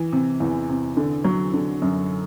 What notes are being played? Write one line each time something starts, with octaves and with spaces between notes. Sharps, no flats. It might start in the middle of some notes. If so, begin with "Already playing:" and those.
Already playing: E3
C3
E2
C3
D3
F#3
D3
F#2